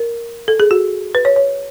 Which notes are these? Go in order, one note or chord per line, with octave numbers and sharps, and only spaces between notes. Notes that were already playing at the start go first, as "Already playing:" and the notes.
Already playing: A#4
A4
G#4
F#4
B4
C#5
C#5